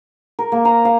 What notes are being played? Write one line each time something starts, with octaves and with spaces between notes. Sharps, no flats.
A#4
A#3
A#5
F5